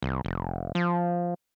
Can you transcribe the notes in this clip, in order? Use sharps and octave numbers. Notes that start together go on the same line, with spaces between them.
C2
F1
F3